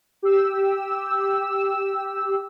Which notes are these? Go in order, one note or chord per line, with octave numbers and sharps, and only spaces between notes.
G4 E6